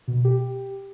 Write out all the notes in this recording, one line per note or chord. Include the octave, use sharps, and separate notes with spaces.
B2
G4